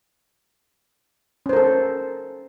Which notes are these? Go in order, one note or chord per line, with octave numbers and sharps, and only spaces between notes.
C#4 A4 A#4 C5